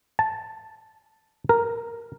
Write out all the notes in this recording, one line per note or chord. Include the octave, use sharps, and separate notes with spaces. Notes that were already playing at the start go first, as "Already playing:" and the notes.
A5
A#4